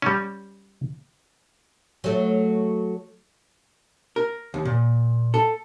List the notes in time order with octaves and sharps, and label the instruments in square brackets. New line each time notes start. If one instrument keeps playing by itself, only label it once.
[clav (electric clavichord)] G3 C#4
[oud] F#3 A3
[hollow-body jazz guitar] A#4
D#2
A#2
A4